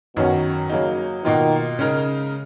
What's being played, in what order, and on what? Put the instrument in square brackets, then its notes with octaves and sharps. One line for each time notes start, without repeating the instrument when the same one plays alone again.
[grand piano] F#2 D#3 F#3 C#4 [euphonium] B2
[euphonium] C#3 [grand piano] F#3 A#3 D#4
[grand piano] B2 A#3 F4 [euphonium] D#3
[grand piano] C#3 G#3 D#4 A#4